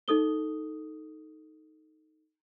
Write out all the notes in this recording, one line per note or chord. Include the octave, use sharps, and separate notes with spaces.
D#4 A4 D#6 G7